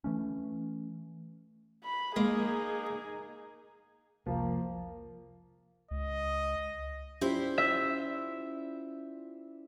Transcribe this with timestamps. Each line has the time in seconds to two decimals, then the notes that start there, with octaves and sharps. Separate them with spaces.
0.04 E3 A3 C#4
1.85 B5
2.16 G#3 A#3 D#4 G#4
4.27 F1 C2 F3 A#3
5.91 C#2 D#5
7.21 C#4 E4 F4 G4 C5 D5
7.58 E5